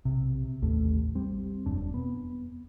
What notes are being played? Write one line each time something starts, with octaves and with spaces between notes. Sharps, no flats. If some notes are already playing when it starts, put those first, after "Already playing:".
B1 C3
A1 D#2 A3
G3 C4
E1 F#2 C4 D4
B3